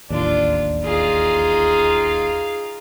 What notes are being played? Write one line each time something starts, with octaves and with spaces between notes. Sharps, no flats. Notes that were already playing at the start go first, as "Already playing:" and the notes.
D1 A1 D#2 D4 F4
D#4 F4 G#4 F5